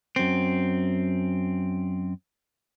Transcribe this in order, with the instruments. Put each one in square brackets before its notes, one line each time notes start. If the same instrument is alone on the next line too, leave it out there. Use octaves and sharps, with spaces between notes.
[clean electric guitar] F#2 C4